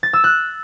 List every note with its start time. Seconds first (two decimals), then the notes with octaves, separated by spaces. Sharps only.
0.03 A6
0.13 E6
0.24 F#6